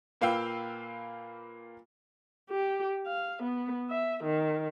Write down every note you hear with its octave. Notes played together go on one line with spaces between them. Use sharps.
A#2 A#3 B4 F5 G5 E6
G4
F5
B3
E5
D#3